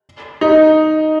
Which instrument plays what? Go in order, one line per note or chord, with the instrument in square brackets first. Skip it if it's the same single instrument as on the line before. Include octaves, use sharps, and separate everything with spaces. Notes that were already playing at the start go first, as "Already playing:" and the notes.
[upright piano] D#4